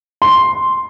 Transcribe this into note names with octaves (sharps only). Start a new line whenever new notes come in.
C6